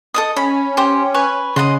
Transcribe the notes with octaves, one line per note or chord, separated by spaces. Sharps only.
A4 D#5 D#6
C#4 B5
G4 C5
B4 C#5 G#5
C#3 D#5 F#5 C6